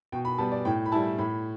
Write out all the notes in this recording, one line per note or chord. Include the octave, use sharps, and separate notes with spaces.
B2 G5
B5
G3 B3 A5
D5
A2 G5
B5
G3 E4 A5
A2 B5